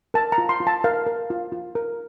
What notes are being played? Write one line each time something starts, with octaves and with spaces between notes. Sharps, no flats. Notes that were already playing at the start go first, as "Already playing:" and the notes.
A#4 A5
A#5
F4
C6
F4
A5
A#4 F5
A#4
F4
F4
A#4